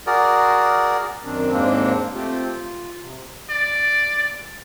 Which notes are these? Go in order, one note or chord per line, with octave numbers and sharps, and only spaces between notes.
F#4 G#4 A#4 D5
F#2 D#3 C4 D4
D#2 G#2 G#3 A#3 C4 D4
A3 C4 F4 G4
F4
C3
D5